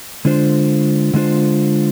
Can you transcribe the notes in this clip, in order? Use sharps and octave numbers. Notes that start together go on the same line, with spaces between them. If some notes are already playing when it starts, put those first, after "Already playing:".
D3 G#3 D4 F4 C5
D3 G#3 D4 F4 C5